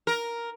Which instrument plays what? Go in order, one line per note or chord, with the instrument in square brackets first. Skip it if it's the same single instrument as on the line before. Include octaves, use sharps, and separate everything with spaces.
[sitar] A#4